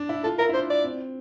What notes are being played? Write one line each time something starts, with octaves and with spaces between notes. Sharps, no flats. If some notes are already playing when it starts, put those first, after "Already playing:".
Already playing: D4
E4
F4 A4
E4 A#4
E4
D4 C5
D5
C4